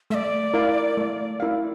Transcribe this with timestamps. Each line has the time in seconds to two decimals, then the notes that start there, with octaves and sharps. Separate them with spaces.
0.10 A3 E5
0.14 D5
0.54 E4 A#4 F5
0.97 A3
1.40 E4 A#4 F5